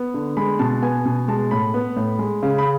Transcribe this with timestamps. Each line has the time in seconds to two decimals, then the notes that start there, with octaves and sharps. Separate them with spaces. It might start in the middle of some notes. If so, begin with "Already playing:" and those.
Already playing: B3
0.14 D3
0.37 G#3 B5
0.59 B2 A5
0.82 B3 G#5
1.06 B2
1.28 G#3 A5
1.51 A2 B5
1.74 B3
1.96 A2
2.19 G#3
2.43 C#3
2.58 B5